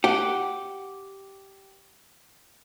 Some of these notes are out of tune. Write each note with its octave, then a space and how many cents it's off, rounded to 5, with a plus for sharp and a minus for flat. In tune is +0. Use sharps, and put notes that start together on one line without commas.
G4 -10 F#5 +0